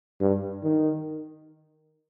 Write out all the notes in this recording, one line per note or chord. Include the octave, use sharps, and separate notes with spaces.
G2
D#3